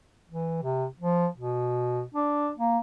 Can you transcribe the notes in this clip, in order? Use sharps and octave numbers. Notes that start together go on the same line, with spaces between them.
E3
C3
F3
B2
D4
A#3